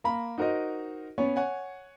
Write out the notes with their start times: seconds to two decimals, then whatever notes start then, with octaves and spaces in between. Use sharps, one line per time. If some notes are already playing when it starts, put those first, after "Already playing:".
0.04 A#3 A#5 B5
0.38 D#4 F#4 A#4 C5 D#5
1.18 B3 C#4 C#5
1.36 C#5 F#5 G#5